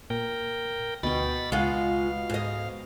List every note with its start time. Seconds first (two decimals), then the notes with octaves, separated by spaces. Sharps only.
0.10 A#2 A#4 G5
1.03 D2 B2 G5 B5 A6
1.52 C#2 G#3 F4 F5 F#5
2.30 G#2 D#5